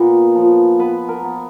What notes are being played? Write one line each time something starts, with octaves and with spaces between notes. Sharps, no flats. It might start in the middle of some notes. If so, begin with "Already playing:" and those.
Already playing: A#2 B3
F3
B3 B4
A#4
B3